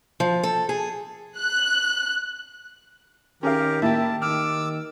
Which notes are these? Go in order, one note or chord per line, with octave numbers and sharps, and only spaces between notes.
F3
A4
G#4
F#6
D#3 C#4 G4 G#4 A#4 F5
A#3 E4 G4 A5
D#3 D6 E6 F6